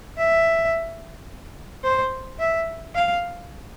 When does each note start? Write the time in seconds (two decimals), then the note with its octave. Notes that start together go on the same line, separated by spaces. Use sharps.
0.18 E5
1.84 C5
2.39 E5
2.95 F5